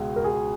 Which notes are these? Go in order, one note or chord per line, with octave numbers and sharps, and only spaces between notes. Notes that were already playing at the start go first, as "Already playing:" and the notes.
Already playing: C#2 B2 G#3
A#4
G#4